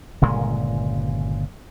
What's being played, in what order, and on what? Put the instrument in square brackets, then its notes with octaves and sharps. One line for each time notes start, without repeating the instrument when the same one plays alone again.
[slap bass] G1 A#2 C#3 G#3